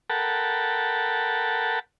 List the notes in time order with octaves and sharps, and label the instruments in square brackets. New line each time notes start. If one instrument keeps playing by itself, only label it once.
[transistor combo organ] A4 A#4 F#5 G5 A5 B5